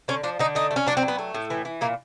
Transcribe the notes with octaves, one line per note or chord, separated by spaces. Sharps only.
D3 C#4
F3 D4
D3 D#4
A3 D#4
A3
C#4
F#3 D4
C4
F#3
B3
A3
A2
E3
E3
A#2 A#3